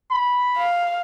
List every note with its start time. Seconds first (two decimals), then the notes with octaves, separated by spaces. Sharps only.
0.11 B5
0.57 F5